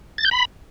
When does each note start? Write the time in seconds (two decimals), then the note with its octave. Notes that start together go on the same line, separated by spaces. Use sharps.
0.18 A6
0.25 G6
0.31 B5